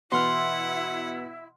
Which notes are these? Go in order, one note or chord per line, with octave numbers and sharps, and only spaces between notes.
B2 E3 B3 E4 F#5 C6 F6